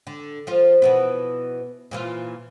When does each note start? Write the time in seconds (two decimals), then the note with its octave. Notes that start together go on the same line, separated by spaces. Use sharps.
0.07 D3
0.47 F3 F4
0.82 B2 E3 B3
1.91 A#2 E3 F4